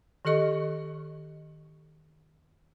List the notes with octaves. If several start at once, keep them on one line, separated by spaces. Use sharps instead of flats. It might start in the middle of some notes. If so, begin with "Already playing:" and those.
D#3 G4 A4 D#5 C#6